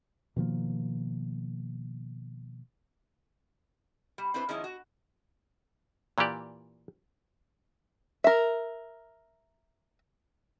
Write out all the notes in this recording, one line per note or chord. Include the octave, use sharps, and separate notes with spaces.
B2 D#3 F3 A#3
G3
C4 D4 E4 B4 C5
D#3 F3 G#3 C#4 E4
F#4
A#2 E3 A#3 G4 D5
A#4 E5